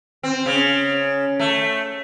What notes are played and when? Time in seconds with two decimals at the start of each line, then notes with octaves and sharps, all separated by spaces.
0.23 C4
0.46 C#3
1.39 A3